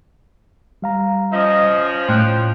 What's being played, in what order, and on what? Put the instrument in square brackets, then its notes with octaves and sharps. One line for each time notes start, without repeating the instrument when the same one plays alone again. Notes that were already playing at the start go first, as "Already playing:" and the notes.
[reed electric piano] G3 F5 A#5
[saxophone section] F3 C#4 [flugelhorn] D#5
[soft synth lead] A2 [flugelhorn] G5 [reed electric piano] C6 F#6